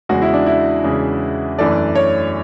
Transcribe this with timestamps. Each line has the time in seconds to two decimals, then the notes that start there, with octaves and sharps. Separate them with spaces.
0.09 E2 C#3 G#3 F#4
0.22 E4
0.34 D4
0.46 E4
0.84 E2 C#3 G#3
1.58 F#2 E3 A3 D4 D5
1.95 C#5